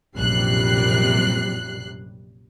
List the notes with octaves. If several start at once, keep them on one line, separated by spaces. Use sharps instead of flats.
A#1 F#2 C3 G3 F#6 C7